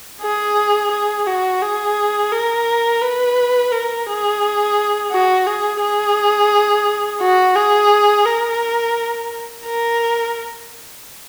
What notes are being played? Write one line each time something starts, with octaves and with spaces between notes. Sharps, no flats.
G#4
G#4
F#4
G#4
A#4
B4
A#4
G#4
F#4
G#4
G#4
F#4
G#4
A#4
A#4